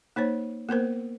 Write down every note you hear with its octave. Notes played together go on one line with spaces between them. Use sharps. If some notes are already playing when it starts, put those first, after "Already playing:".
A#3 D#4 C5 C#5
A#3 B3 A#4 C5